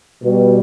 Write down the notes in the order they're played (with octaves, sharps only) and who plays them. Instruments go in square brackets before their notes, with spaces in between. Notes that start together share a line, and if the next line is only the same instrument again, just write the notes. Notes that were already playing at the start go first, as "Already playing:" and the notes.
[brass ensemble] B2 G3